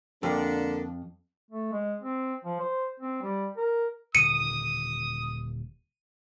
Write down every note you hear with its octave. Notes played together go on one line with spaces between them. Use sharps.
F2 D3 A#3 D4
A3
G#3
C4
F3
C5
C4
G3
A#4
D#1 D3 D#3 D#6 C#7 D#7